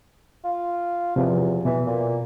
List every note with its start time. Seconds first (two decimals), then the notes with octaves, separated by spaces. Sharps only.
0.44 F4
1.16 E2 C3 F3
1.65 B2 E3
1.86 A#2